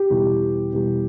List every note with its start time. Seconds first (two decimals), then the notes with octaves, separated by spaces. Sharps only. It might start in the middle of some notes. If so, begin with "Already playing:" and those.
Already playing: G4
0.10 E2 B2 G3
0.72 E2 B2 G3